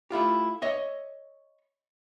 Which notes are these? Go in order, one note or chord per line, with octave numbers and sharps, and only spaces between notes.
A3 E4 F4 G4
C#5 D#5 E5